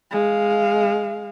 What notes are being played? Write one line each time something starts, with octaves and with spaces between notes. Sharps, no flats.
G#3 F5